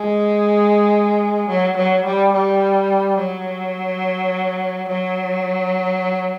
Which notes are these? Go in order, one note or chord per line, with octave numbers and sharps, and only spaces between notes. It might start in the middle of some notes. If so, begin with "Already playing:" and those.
Already playing: G#3
F#3
F#3
G3
G3
F#3
F#3